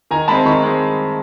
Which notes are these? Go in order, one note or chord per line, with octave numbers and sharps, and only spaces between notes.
D#3 G#5 A#5
G#3 C4 A5 B5
D#3 B5 C#6
G#3 C4